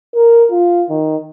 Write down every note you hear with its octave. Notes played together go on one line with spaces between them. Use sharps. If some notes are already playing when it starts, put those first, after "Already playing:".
A#4
F4
D#3